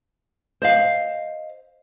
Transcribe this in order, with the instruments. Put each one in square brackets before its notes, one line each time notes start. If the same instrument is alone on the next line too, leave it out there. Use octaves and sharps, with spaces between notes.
[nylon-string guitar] C5 D#5 F5